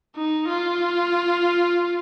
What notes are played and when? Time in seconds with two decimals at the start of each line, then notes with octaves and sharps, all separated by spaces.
0.16 D#4
0.49 F4